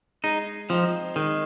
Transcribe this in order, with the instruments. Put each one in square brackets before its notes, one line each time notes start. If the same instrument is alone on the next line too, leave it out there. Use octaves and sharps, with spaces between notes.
[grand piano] G#3 [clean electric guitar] D#4
[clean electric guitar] F3 [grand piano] C4 D#4
[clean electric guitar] D#3 [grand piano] G#3